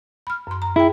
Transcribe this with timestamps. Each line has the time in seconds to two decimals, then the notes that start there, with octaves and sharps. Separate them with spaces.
0.27 B5 F6
0.47 F#2 C6
0.62 A#5
0.76 E4 G#4 G5